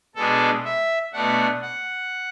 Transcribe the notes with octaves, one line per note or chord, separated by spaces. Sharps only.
B2 G#3 D4 A4
E5
B2 A3 D4 F#5
F#5